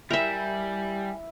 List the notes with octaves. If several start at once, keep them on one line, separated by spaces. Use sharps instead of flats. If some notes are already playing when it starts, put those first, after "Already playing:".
G3 E4 A#4 E5 G#5